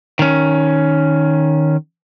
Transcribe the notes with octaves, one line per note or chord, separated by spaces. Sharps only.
D#3 C#4